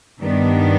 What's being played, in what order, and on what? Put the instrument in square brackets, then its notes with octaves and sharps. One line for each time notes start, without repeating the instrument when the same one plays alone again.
[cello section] G2 D#3 G3 B3 D4